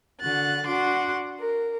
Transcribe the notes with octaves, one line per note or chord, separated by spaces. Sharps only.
D3 F#4 F#6 A6
D4 F#4 F#5 C6 D6
A#4